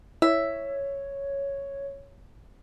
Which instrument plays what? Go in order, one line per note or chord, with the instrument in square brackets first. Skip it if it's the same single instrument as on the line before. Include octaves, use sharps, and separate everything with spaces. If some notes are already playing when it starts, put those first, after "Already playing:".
[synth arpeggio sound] E4 [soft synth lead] C#5 [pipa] E5